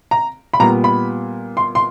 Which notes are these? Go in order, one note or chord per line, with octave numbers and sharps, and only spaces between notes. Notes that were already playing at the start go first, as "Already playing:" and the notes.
A#5
B5
A#2 G3 B3 A#5
B5
C6
C6